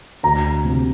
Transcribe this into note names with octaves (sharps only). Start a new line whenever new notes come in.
D2 A#5
C3 F3